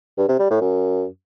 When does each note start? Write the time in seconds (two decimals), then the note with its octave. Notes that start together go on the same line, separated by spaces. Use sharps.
0.18 G2
0.28 C3
0.39 G3
0.50 A2
0.61 F#2